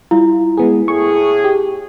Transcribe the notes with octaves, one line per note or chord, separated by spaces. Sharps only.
G3 E4 F4
G#3 B3 G#4
A2 G#4 C#6
G4